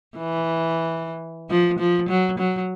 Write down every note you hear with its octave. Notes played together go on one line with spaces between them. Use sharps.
E3
F3
F3
F#3
F#3